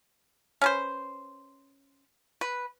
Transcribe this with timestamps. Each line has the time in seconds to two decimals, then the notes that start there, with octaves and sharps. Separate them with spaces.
0.61 C#4 B4 C5
2.41 B4